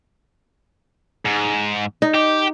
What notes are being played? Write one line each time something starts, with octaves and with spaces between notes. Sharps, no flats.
G#2
D#4
G4